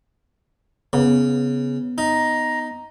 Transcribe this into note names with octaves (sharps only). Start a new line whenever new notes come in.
C#3 B3
D#4 A#5